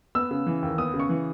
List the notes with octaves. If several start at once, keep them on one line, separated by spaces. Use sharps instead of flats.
B3 E6
C#3
E3
D#2
B3 D#6
C#3
C#6
E3